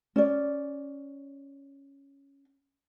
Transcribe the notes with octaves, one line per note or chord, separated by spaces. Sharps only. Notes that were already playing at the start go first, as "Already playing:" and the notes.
C#4 D5